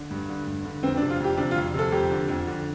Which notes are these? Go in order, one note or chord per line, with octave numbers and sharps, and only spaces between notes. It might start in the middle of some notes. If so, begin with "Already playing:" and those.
Already playing: D3
G2
D3
G2
D3
F2 C4
D4
C3
F4
F2 G4
C3 D4
F4
F2
C3 A4
F2 G4
D3
F2
D3